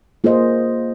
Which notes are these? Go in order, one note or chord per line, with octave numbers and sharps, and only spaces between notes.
A#3 F4 G#4 C5 D#5